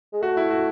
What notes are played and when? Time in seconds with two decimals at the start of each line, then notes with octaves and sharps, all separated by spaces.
0.13 G#3
0.22 A3 F#4
0.37 E4
0.50 F#4